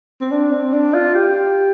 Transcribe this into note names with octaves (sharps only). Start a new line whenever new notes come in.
C4
D4
C4
D4
F4
G4